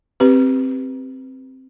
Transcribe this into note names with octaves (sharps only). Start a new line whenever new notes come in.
C4 G4 B4